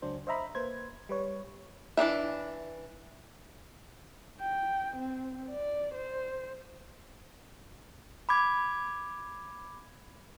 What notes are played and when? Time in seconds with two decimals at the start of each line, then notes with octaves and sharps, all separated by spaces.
0.02 C#2 F#3 D4 C5
0.27 C5 D#5 E5 A#5 B5
0.55 A#3 B4 C5 G#6
1.09 G3 B4 C#5
1.97 E3 D4 D#4 E5
4.40 G5
4.96 C4
5.51 D5
5.94 C5
8.29 B5 D6 G#6